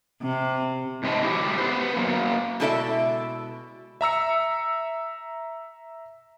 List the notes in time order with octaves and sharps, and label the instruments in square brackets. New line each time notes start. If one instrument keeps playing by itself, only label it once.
[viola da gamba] C3
[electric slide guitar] G#2 C3 C4 B4 D#5 A5
F#3 E4 G4
B3 B4 C5
F#3 A#3
[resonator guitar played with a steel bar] B2 G#3 E4 A4 D5 E5
[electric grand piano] E5 A#5 E6 C#7